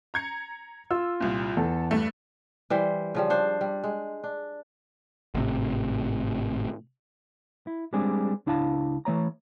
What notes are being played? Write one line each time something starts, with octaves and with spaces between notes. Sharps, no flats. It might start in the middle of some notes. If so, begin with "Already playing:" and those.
A#5 G#6 C#7
F4 E6
C2 A#2
E2 A4
G2 A3
E3 G3 C5
C#3 F3 G3
D4 C5
G3
G#3
D4
G#1 A2 C3
E4
G3 G#3 C4 D4 G#4
C#2 D4 E4 F5 A5
E3 A3 C#5 A#5